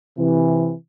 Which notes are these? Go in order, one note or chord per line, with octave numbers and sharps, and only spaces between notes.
C3 E3